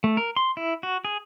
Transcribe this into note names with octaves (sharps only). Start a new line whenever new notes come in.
A3
A#4
C6
E4
F#4
G#4